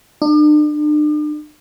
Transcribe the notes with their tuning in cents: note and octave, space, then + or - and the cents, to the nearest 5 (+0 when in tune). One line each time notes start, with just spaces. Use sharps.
D4 +40